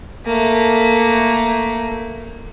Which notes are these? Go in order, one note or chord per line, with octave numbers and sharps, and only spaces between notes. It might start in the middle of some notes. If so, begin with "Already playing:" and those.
A3 A#3